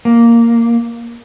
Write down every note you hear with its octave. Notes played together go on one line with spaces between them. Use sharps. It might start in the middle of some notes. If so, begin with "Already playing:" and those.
A#3